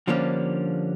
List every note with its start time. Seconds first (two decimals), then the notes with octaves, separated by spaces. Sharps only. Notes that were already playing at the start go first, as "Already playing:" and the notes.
0.07 D3 F3 G3 A#3 C#4 D4